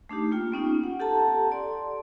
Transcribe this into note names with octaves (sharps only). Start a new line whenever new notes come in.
A3 D4 D#4 G4
A#3 F4 G5
B3 C#4 D#4 F4
F#5
G4 A4 F#5 A5 A#5
D5 C6